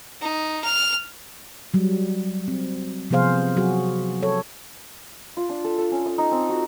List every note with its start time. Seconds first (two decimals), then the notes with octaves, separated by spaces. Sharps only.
0.21 D#4
0.64 F6
1.74 F#3 G3
2.48 C4
3.10 C3 F3 B3 G#4 C5 F5
3.56 F#3 F#4 G#4
4.23 A4 C#5
5.37 F4
5.49 D4
5.64 A4
5.78 A4
5.91 C#4
6.06 D#6
6.18 D#4
6.31 C4
6.49 F#4